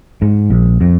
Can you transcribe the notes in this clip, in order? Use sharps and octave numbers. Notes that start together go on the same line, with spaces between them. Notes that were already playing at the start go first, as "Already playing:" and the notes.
G#2
A#1
F2